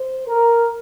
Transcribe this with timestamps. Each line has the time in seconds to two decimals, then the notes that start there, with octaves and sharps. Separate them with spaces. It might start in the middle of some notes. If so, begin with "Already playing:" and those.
Already playing: C5
0.28 A#4